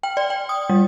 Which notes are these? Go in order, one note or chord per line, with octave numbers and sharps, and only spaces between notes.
G5
D5
G5
D#6
G3